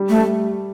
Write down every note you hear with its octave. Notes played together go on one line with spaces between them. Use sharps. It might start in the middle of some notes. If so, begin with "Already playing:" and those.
Already playing: G3
A3
G3